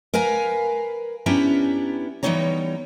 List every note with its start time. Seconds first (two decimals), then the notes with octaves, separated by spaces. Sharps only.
0.14 A#4 B4 F5 G#5 A#5
1.26 B3 C#4 D4 E4 G4 A#5
2.23 E3 G3 B3 D#4 C#5 A#5